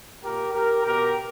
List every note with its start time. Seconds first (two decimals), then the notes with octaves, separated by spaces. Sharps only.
0.22 A#2 G4 A#4
0.53 G4 A#4
0.85 B2 G4 A#4